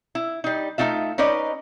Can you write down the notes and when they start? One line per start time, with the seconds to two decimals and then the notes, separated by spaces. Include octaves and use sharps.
0.15 E4
0.44 G3 D#4
0.78 A3 C#4 D#4 F4 E5
1.18 C#4 D#4 B4 D5 D#5